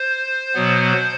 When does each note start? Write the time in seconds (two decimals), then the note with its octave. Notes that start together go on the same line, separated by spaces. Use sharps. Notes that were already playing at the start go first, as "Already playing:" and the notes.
Already playing: C5
0.54 B2 F#3 B3